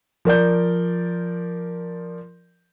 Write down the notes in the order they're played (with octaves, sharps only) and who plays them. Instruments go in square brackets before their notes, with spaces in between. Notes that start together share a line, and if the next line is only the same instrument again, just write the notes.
[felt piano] F3 A#4 D5 G6